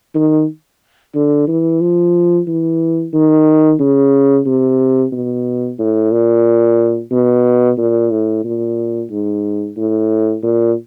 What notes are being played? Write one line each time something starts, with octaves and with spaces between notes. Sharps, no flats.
D#3
D3
E3
F3
E3
D#3
C#3
C3
B2
A2
A#2
B2
A#2
A2
A#2
G#2
A2
A#2